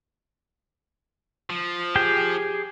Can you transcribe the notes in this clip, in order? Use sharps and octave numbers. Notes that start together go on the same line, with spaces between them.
F3
G4 G#4 G5